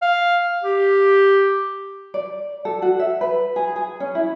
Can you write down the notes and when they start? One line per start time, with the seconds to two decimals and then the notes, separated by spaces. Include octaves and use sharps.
0.02 F5
0.63 G4
2.14 D5
2.65 A4
2.82 F#4
2.99 E5
3.21 B4
3.56 G#4
3.76 G#4
4.00 C#4
4.15 E4